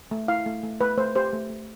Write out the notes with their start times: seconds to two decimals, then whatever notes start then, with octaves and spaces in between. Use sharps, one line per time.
0.11 A3
0.28 E4 F5
0.46 A3
0.63 A3
0.81 A3 B4
0.98 A3 C5
1.15 G4 C5
1.33 A3
1.50 A3